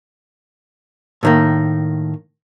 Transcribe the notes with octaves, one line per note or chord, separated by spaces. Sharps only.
A2 D#3 A#3